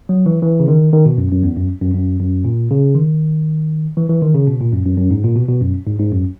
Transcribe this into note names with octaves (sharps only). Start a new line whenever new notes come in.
F#3
E3
E3
C#3
D#3
D#3
B2
F#2
F#2
E2
F#2
F#2
F#2
F#2
A#2
C#3
D#3
E3
E3
D#3
C#3
B2
A#2
F#2
F#2
F#2
G#2
A#2
B2
B2
F#2
G#2
G#2
F#2